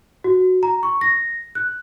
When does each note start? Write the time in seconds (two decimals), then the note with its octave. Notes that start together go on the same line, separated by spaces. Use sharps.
0.24 F#4
0.63 A#5
0.83 C#6
1.01 A#6
1.55 F#6